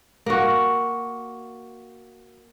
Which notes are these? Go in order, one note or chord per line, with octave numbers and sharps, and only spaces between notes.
A#3 F#4